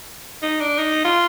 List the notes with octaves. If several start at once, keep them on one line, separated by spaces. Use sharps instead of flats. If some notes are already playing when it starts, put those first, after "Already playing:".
D#4
D4
D#4
F4